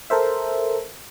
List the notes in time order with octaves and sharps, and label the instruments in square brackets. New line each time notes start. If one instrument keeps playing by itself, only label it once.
[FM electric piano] A4 A#4 C5 E5